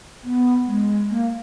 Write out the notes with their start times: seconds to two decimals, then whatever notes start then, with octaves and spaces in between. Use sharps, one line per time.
0.24 B3
0.66 G#3
1.10 A#3